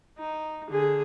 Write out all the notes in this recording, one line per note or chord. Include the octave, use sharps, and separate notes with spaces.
D#4
D3 G#4